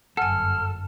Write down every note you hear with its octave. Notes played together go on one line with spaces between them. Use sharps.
G1 F#2 A4 F#5 G#5 F6